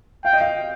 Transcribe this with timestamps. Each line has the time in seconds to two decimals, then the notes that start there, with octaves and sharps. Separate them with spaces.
0.25 F5 G5
0.33 D#5
0.41 F5